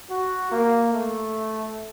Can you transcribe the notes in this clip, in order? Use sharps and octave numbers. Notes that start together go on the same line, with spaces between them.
F#4
A#3
A3